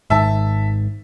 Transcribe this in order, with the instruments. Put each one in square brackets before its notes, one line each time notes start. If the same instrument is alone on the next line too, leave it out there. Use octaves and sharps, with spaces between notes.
[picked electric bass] G#1 G#2 D#3 [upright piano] E5 A5